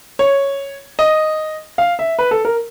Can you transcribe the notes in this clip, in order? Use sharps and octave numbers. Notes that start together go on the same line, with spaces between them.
C#5
D#5
F5
E5
B4
A4
A#4